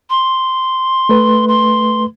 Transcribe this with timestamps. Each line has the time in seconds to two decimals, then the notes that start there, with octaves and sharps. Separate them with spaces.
0.10 C6
1.09 A3 B4
1.48 C6